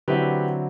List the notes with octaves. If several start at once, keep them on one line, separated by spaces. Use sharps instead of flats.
D3 F#3 C4 E4 G4 B4